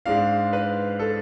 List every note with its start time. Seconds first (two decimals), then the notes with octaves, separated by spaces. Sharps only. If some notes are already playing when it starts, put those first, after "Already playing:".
0.06 G#2 G#3 D4 F5
0.53 B4
0.99 A4